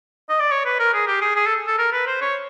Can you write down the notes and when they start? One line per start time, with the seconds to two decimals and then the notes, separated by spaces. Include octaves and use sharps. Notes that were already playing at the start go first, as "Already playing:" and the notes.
0.29 D#5
0.40 D5
0.51 C#5
0.65 B4
0.79 A#4
0.93 G#4
1.07 G4
1.21 G#4
1.36 G#4
1.46 A4
1.67 A4
1.78 A#4
1.92 B4
2.07 C5
2.21 C#5